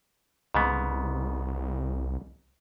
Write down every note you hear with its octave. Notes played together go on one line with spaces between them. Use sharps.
C2 G#2 C#3 B3